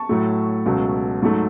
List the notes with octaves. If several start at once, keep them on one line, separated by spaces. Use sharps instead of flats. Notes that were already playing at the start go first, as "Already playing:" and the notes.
Already playing: A5 C#6
A2 F#3 A3
C#2 B2 F#3 A3
G#2 F#3 A3